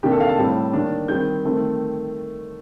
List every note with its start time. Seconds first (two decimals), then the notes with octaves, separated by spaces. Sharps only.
0.03 C3 D#3 A#3 D4 G4
0.12 A4
0.20 F5
0.29 A5
0.38 A2 G3 C4
0.73 D#3 A#3 D4
1.08 D#3 G3 C4 G6
1.45 D#3 A3 C4